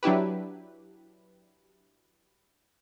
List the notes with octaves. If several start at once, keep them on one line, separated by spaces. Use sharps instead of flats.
F#3 D4 E4 G4 B4